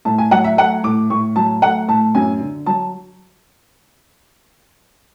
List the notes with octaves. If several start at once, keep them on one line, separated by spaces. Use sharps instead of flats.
A2 A5
G#5
F#3 F#5
E5
A3 F#5
A2 D6
A2 C#6
F#3 A5
A3 F#5
A2 A5
F#2 G#5
D3
F#3 A5